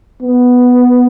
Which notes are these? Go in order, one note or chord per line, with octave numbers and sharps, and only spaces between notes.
B3